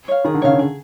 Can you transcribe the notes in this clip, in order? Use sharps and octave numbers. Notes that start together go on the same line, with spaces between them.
C#5 F5
D#3 G#4
D3
C#3 C#5 F5
D3
G#4